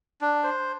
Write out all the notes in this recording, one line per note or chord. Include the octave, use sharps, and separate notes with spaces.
D4
C5